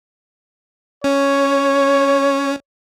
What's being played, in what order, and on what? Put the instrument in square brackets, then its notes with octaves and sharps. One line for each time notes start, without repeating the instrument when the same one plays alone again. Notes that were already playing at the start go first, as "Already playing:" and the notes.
[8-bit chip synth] C#4 [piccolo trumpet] C#5